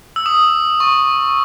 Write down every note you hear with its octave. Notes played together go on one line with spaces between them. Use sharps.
E6
D#6
C#6